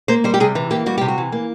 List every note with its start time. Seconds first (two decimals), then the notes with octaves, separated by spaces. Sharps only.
0.08 A#3 C5
0.24 G3 C5
0.34 G4
0.40 C3 G#4
0.55 E3
0.71 A#3 G4
0.86 G3 F#4
0.98 C3 G4
1.08 F#4
1.18 E3
1.32 A#3